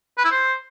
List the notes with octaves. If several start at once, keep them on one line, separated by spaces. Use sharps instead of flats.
B4
E4
C5